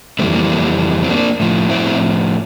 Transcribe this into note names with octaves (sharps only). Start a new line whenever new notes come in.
F2 E3 G3 A3 C4
A#3
A#3
C4
A#3 D4
A2 F3
C4 E4